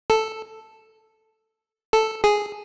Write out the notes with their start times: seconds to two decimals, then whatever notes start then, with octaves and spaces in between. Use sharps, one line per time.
0.10 A4
1.93 A4
2.24 G#4